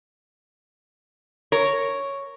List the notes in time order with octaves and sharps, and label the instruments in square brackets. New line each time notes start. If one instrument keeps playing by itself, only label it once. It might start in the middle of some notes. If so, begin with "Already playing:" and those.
[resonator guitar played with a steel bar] A#4 C#5